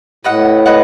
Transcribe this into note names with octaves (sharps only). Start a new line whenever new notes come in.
A2 B4 D#5 F#5
B4 D#5 F#5